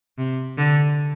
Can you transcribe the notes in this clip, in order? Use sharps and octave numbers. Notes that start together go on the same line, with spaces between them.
C3
D3